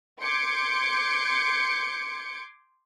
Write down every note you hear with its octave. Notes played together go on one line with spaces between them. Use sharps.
C6 D6 G6 G#6 C#7 D7